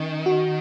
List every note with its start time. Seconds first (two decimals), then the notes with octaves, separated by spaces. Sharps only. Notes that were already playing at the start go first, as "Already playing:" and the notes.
Already playing: D#3 C#4
0.26 F#4